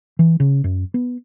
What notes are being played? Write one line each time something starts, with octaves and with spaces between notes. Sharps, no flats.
E3
C#3
F#2
B3